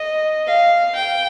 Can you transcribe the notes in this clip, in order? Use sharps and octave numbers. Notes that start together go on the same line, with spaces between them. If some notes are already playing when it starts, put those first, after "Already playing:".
Already playing: D#5
F5
G5